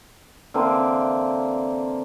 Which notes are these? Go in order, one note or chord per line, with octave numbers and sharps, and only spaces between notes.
D3 E3 A#3 C4